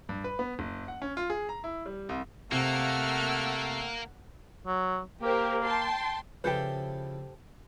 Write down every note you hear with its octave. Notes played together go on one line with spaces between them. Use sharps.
G2
B4
B3
F#1
F#5
C#4
F4
G#4
A#5
E4
G3
C2
C3 A3 A#3 F#5 E6 F6
F#3
A#3 G4 A#4 C5
G5 A5 C6
C#3 F3 E4 G4 A4 B4 C5